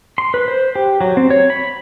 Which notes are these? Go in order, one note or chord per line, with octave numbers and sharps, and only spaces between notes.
C6
B4
C5
G4
F#3
C4
C#5
B5